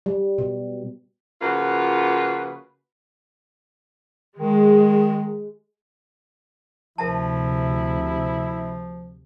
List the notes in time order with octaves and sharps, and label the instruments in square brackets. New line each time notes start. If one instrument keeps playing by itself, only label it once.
[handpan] G3
B2
[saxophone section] C#3 F3 A#3 F4 F#4 B4
[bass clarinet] D#3 [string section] G#3
[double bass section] D2 C3 [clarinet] F3 [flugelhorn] E4 [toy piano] A#4 E5 A5